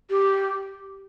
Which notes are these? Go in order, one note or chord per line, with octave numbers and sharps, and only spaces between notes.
G4